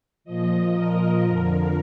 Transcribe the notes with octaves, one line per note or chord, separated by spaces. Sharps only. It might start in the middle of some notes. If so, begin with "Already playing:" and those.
A#2 F3 D#5
A#4
F2 D3 F3